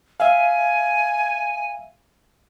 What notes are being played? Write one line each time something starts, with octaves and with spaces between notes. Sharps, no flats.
E5 F5 G#5